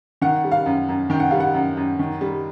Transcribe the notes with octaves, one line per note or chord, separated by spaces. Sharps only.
D#3 F#5
G3
F5
F#2
F#2
D#3 G5
F#5
G3 F5
F#5
F#2
F#2
D#3
G3